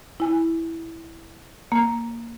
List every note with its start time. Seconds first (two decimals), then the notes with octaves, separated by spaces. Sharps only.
0.20 E4 G#5
1.72 A#3